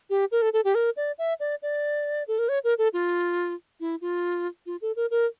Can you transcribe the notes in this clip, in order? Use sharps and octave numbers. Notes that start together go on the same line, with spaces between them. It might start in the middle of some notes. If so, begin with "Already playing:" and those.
G4
A#4
A4
A4
G4
A#4
D5
E5
D5
D5
A4
A#4
C#5
A#4
A4
F4
E4
F4
F4
A4
A#4
A#4